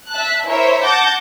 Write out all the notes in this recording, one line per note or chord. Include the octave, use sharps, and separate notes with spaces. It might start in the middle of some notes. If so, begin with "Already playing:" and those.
E5 A5 F#6
E4 A#4 C5 C#5 E5
F#5 A5 D6 G6 A#6